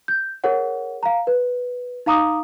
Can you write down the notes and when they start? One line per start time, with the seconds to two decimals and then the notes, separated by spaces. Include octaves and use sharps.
0.08 G6
0.44 G#4 A#4 C#5 F#5
1.03 F5 A#5
1.27 B4
2.06 D#4 F5 A#5 D6 D#6